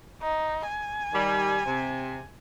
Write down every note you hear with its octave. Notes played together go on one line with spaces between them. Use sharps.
D#4
G#5
D#3 G3
C3